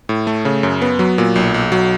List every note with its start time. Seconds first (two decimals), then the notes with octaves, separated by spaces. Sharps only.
0.09 A2
0.27 A3
0.45 C#3
0.63 F#2
0.82 B3
0.99 F#3
1.18 A#2
1.36 B1
1.54 B1
1.72 F#3